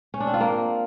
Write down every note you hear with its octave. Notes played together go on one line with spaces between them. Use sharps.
C#4
D4
C4
F4
A#3